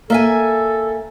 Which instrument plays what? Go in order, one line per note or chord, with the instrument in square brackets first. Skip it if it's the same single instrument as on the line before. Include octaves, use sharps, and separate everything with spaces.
[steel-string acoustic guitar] A#3 E5 G#5 [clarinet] A4